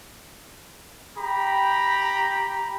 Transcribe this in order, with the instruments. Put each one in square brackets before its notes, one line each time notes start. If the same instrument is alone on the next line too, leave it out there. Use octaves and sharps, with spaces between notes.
[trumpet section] G4 A#5 B5